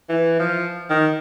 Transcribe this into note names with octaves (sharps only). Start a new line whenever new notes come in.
E3
F3
D#3